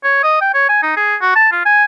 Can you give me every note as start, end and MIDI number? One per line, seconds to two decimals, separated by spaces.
0.04 0.22 73
0.23 0.41 75
0.41 0.54 79
0.54 0.64 73
0.69 0.82 80
0.83 0.92 63
0.97 1.16 68
1.21 1.33 66
1.35 1.48 81
1.52 1.65 65
1.65 1.84 80